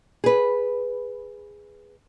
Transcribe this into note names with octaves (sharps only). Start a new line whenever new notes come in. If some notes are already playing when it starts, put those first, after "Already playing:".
G#4 B4